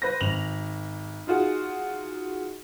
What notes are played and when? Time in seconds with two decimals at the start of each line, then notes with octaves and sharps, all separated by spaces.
0.02 B4 C5 A#6
0.21 G#1 F7 F#7
1.27 D#4 F4 F#4 G#4